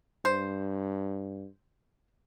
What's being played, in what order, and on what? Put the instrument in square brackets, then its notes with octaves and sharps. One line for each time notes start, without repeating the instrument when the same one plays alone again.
[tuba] G2 [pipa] C5